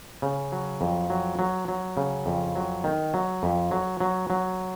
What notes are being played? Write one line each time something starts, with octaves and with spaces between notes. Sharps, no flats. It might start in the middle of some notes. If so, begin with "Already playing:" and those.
C#3
F#3
F2
F#3
F#3
F#3
C#3
F2
F#3
D#3
F#3
F2
F#3
F#3
F#3